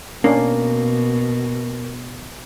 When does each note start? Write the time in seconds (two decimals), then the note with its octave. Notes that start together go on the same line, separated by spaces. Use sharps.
0.24 B2 A#3 C#4 D4